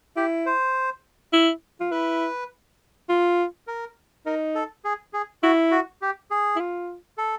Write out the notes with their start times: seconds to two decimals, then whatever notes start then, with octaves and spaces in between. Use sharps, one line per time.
0.16 E4 G4
0.46 C5
1.33 E4
1.81 F4
1.91 E4 B4
3.09 F4
3.67 A#4
4.26 D#4 A#4
4.55 A4
4.85 G#4
5.13 G#4
5.43 E4 F#4
5.71 F#4
6.02 G4
6.31 G#4
6.56 E4
6.60 F4
7.18 A4